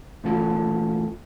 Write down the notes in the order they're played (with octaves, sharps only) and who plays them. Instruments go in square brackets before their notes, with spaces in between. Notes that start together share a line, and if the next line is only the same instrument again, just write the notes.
[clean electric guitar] A#2 E3 A3 C#4 F4 A4